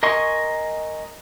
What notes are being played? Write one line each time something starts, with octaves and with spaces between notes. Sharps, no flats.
A#4 D#5 G#5 C6 C#6